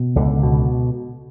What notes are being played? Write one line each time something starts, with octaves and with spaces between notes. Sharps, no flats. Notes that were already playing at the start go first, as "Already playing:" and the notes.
Already playing: B2
C#2 D3
B2